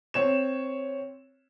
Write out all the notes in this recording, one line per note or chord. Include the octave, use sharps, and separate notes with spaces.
C4 C#5 E7